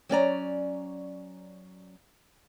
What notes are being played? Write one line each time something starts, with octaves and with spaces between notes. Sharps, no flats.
F#3 C#4 D5 A#5